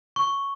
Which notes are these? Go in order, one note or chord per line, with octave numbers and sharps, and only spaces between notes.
C#6